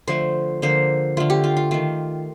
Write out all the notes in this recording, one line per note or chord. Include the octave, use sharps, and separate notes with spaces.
D3 F3 A3 C5
D3 F3 A#3 C5
D3 A3 F4
G4
F4
F4
D#3 A3 F4